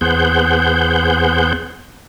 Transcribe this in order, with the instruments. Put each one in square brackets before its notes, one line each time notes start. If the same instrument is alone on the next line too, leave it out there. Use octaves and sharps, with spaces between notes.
[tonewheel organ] E2 B3 G#4 C5 F#5 G6